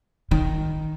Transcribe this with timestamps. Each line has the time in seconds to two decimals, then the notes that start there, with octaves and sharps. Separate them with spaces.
0.31 D#3